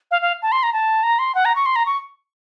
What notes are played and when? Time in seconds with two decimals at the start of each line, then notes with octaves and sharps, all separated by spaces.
0.11 F5
0.22 F5
0.42 A5
0.52 C6
0.63 A#5
0.73 A5
1.03 A#5
1.19 C6
1.35 F#5
1.45 A#5
1.55 C#6
1.66 C6
1.76 A#5
1.86 C#6